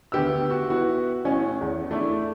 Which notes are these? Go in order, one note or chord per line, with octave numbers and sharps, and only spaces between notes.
D2 B3 G4 B4 E6
F#4
B3 E4 F#4
A1 A2 C#4 G#5
E2
A3 D4 E4